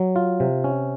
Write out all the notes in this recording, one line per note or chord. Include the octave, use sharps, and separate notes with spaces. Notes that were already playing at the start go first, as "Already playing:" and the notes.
Already playing: F#3
F4
C3
C#4